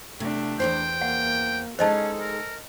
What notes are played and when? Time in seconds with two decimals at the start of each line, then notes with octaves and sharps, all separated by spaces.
0.20 C3 A3 D4
0.60 E2 G#2 C5 G5
1.01 A#3 F#5
1.79 G#3 C#4 D#4 G#4 A4 C5 D#5 A5
2.20 A#4